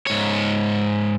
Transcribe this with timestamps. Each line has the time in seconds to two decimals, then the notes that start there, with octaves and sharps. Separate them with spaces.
0.07 G#2 C#5